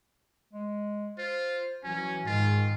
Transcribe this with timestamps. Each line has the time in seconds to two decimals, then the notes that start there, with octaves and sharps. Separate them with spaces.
0.53 G#3
1.18 F4 C5
1.84 E3 F#3 C#4 G#5
2.27 G#2 D#3 F4